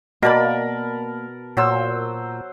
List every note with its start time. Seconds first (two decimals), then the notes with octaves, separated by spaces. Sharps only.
0.22 B2 A#3 A#4 D5 A5 B5
1.57 A#2 F#3 C5 E6